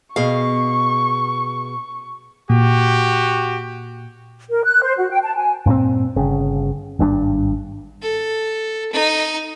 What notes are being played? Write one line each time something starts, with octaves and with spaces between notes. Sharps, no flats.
B2 G#4 F5 C#6
A#2 F#4 G4
A#4
F#6
C5
F#4
G5
A5
G#5
G2 A#2 B3 C4
G1 C#3
G#1 G2 C#4 D4
A4
D#4